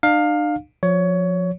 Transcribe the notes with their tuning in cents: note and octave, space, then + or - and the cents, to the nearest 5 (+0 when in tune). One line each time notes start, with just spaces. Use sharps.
D4 +45 F5 +15
F3 +25 C#5 +20